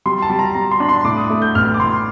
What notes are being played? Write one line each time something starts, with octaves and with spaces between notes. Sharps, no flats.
G3 C6
A5
G3
A#5
G3 A#5
C6
D4
C6
A2 D6
D#6
A3
G6
A1 F6
D6
A2 C6